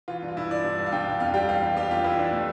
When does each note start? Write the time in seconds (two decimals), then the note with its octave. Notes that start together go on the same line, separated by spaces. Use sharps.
0.08 E3 F4
0.22 G2
0.28 F4
0.36 G2 E4
0.50 G2 D5
0.64 G2
0.78 G2
0.87 F5
0.92 G2 G5
1.07 G2
1.20 F2 F5
1.34 G3 G5
1.48 E3 F5
1.62 G3
1.77 G3 G4
1.91 F2 F4
2.04 E3 E4
2.19 G3 D4
2.33 A3